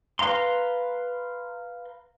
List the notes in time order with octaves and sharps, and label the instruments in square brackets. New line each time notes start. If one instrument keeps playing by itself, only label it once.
[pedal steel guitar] B4 F5 A#5 C6